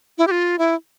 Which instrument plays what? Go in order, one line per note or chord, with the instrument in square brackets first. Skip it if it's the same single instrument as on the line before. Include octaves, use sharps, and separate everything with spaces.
[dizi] E4
G4
F4
E4